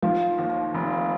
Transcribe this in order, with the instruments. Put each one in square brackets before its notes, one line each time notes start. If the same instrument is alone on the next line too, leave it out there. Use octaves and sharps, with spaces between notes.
[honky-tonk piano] D#3 [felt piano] F3
[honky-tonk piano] D#2
F1